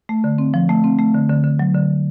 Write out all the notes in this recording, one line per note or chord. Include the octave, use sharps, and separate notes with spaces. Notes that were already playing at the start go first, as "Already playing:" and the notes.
A3
D3
C4
F3
A3
C4
A3
D3
D3
D3
F#3
D3